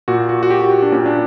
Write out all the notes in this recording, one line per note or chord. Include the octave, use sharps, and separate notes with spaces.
A#2 F#4
F#4
F#4
G4
G4
F#4
D4
A#2 C#4
D4